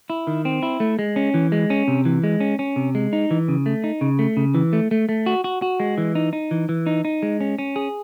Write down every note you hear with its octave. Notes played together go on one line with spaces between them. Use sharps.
E4
D#3
C4
E4
A3
G#3
C#4
E3
G#3
C#4
C3
E3
G#3
C#4
C#4
C3
G#3
D#4
E3
C#3
A3
D#4
C#3
A3
C#3
E3
A3
A3
A3
F#4
F#4
F#4
G#3
E3
D#4
D#4
E3
E3
D#4
D#4
G#3
C#4
C#4
G#4